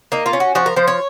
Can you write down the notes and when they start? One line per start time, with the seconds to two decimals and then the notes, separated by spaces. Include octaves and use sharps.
0.12 A#3 D#4
0.26 F4
0.33 C#4
0.40 F#4
0.55 F3 F#4
0.66 A#4
0.76 F3 C5
0.88 C#5